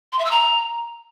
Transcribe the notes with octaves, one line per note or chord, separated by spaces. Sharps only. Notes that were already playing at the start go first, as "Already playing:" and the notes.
C6
E5
E6
A#5